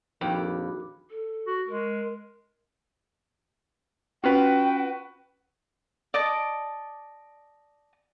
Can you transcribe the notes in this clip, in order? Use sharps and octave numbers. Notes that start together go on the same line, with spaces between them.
A#1 F2 D#3 F#4 B5 D6
A4
F#4
G#3 A#4
C#4 F4 F#4 B4 G5
D5 D#5 A5 D6